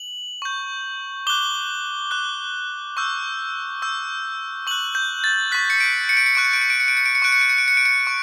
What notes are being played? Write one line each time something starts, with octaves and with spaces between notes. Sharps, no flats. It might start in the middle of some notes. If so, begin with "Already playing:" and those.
Already playing: F#7
C#6 G6
D6 F#6 G7
D6 F#6
C#6 E6 G6
C#6 E6 G6
C#6 F#6 F#7
G6
A6
C#6 F#6 B6
C#7
D7
C#7
D7
C#7
C#6 F#6 D7
C#7
D7
C#7
D7
C#7
D7
C#7
D7
C#7
C#6 F#6 D7
C#7
D7
C#7
D7
C#7
D7
C#7
C#6